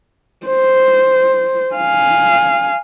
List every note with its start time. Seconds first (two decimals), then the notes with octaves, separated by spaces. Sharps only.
0.47 C5
1.75 F5 G#5